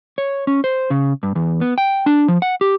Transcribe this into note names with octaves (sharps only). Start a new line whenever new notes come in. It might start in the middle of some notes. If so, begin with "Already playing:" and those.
C#5
C#4
C5
C#3
G2
E2
B3
G5
D4
F3
F#5
G4